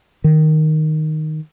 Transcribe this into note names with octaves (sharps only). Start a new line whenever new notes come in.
D#3